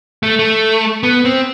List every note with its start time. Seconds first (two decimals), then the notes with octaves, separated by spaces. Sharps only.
0.23 A3
0.39 A3
1.03 B3
1.25 C4